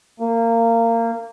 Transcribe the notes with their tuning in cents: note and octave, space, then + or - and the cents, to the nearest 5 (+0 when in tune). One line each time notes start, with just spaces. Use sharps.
A#3 -20